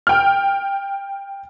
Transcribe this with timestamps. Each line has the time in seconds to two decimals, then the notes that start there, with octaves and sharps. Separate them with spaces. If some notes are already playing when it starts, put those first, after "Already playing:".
0.07 G5 F6